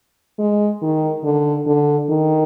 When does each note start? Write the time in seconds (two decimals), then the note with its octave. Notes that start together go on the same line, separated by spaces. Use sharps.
0.39 G#3
0.82 D#3
1.24 D3
1.67 D3
2.10 D#3